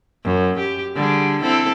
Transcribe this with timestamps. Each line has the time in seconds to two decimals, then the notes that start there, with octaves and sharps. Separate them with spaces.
0.24 F#2
0.60 G4
0.95 D3 G3 G#4
1.41 C4 E4 A4